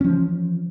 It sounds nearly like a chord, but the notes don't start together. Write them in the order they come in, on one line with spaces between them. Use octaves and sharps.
C#4 F3 E3